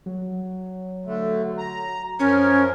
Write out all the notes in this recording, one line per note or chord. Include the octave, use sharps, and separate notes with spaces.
F#3
D3 A3
A#5
F#2 F3 C#4 A#4